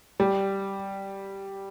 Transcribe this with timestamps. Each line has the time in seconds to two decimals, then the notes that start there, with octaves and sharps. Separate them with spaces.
0.20 G3